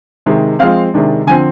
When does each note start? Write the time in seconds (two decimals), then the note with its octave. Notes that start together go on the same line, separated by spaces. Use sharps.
0.26 C3 D#3 G#3
0.59 F3 G#3 C4 F5
0.94 C3 D#3 G#3 D4
1.27 D3 F3 C4 G#5